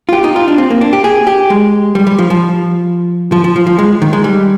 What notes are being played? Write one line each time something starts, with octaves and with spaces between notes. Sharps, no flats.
F4
G4
D#4
F4
D4
C4
A#3
D4
G4
G#4
G4
G#3
G3
G3
F3
F3
F3
F3
F3
F3
G#3
D#3
G#3
G3